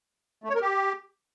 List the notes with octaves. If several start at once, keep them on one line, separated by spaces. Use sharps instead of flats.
A3
C#5
A#4
G4